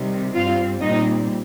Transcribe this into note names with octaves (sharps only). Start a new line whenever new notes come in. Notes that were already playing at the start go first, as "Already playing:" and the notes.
Already playing: C3 D#3 G3
G2 G3 C4 F4 F5
A#2 G3 C4 D#4 D#5